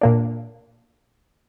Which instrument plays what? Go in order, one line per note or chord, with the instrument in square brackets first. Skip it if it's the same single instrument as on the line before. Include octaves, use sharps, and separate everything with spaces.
[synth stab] A#2 A#3 D4